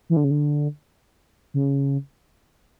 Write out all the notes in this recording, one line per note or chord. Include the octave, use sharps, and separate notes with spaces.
E3
D3
C#3
D3
C#3